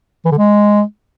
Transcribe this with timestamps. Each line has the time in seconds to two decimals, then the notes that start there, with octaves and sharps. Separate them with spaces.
0.25 E3
0.31 D3
0.38 G#3